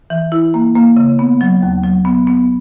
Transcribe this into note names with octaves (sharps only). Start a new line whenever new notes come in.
E3
E4
A#3
A#3
C#3
B3
F#3
D#2
F#3
B3
B3